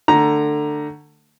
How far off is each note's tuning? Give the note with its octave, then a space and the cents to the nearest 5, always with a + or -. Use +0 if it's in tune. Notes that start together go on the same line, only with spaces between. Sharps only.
D3 +20 A3 +20 A#5 +5